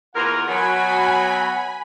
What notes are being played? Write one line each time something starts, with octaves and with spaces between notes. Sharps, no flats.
E2 F4 A#4 F#5
B2 F#3 G#5 B5